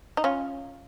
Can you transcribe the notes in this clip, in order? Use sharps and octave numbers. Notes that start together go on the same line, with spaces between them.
D#4
C#4 F4